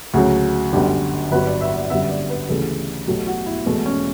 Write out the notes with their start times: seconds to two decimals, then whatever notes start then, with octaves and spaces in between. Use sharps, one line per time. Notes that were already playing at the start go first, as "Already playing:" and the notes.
0.14 D2 C#3 F#3 F#4
0.73 G1 F#2 D3 G4
1.32 G1 G2 F#3 B4
1.46 D5
1.61 E5
1.76 D5
1.90 G1 F#2 D3 G3 B3 E5
2.09 D5
2.30 B4
2.49 D2 C#3 E3 G3 A4
3.07 B1 B2 F#3 A3 G4
3.27 F#4
3.46 E4
3.66 E1 E2 B2 A3
3.86 C#4